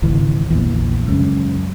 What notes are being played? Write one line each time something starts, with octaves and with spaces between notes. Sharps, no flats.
G#1 C#2 E3
A#1 E2
C#2 F#2